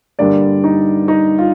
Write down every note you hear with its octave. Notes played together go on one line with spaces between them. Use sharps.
G2 D3 G3 A#3 D5
D#4
D#4
F4